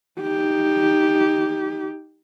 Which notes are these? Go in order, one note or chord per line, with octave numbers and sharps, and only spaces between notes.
D#4 G4